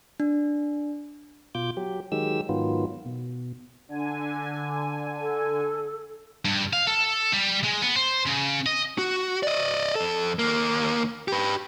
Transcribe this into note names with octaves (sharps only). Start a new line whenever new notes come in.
D4
B2 F4 D6 G6
F#3 G4
D#3 F#3 G#3 G4 E6
G#2 D#3 F#3 B3 F4
B2
D3 G#5
A4
G2
F5
A4
G3
G#3
B3
C5
C#3
D#5
F#4
D5 D#5
F2 A4
D#2 A#3
G4 B4